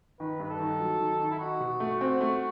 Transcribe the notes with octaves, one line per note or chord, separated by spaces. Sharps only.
D#3 B4
G2 B4
A4
D#3
F#3
D#3
D#3
E4
D#4 F#4
B2
A3
C4 F#4
A3